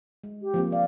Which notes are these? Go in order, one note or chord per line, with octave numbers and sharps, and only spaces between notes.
G#3
G4
F3 A#3 C4
D5 F5